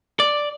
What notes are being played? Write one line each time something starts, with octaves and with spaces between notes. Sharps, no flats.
D5